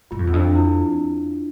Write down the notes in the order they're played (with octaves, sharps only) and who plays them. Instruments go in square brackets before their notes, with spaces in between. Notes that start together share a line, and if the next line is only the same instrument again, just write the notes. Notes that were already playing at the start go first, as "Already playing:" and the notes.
[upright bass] G2 [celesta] F4
[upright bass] F2
E2
[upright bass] F2 [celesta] D4
[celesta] E4